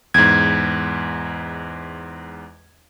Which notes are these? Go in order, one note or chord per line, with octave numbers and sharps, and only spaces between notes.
E2 G#2 G#6